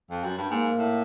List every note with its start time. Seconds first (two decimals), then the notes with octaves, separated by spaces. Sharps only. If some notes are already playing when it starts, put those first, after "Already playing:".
0.10 F2
0.24 F#2
0.38 G2
0.50 G#2 A#3
0.78 A2